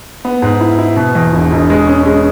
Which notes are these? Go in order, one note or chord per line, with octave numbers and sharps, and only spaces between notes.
B3
G#2
E4
E4
B2
E2
E1
E1
G#3
C#4
G#3